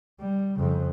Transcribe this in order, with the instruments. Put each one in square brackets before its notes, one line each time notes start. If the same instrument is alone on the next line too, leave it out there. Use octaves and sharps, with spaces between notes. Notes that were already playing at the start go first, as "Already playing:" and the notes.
[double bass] G3
F2 C#3